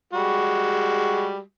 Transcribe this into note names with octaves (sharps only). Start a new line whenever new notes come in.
G3 G#3 F#4